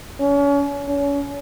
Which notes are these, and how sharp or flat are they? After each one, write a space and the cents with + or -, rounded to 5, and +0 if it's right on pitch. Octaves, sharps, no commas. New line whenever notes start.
C#4 +35
C#4 +35